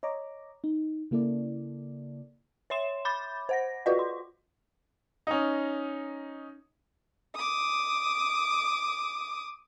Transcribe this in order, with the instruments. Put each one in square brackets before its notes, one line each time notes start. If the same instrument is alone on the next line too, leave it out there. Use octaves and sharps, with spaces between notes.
[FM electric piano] C#5 D#5 A#5 D6
D#4
C#3 A#3 E4 A4 D5
[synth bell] C#5 E5 C6 E7
B5 D6 G6 A6
C5 F#5 A#6
F4 F#4 B4 D5 D#5
C6
[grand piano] C#4 D#4
[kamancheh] D6 D#6